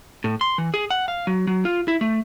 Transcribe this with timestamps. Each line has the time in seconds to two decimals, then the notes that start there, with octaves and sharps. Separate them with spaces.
0.24 A2
0.41 C6
0.58 E3
0.74 G#4
0.90 F#5
1.08 F5
1.27 F#3
1.47 F#3
1.65 F4
1.88 E4
2.01 A3